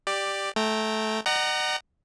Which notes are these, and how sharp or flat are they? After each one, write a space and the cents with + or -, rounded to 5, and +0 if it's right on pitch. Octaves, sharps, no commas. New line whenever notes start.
G4 +0 D5 +10
A3 -15 G5 +0 A#5 -10
D#5 -45 F#5 +25 A#5 +0